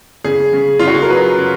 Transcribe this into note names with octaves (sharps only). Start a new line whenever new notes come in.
C#3 G#4
C#3
C#3 F4
F#4
G#4
A#4
F#3 B4
C#3